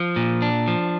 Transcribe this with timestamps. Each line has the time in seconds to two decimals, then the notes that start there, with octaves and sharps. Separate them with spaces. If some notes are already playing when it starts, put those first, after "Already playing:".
Already playing: F3
0.16 A#2
0.42 D4
0.68 F3